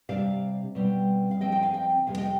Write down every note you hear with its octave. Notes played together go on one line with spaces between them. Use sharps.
C3 G3 D4 D5 F5
B2 G3 C4
F5
D3 F3 C4 D#5 G5
D#5 G5
F5 G#5
D#5 G5
F2 C3 G3 B3 F5 G#5
D#5 G5